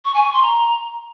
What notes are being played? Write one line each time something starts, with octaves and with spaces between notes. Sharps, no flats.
C#6
G#5
C#6
C6
A#5